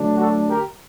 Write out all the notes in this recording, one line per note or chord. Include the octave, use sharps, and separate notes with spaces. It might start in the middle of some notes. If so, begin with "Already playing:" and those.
Already playing: D3 F#3 A3 D4
F#4 A4
G4 A#4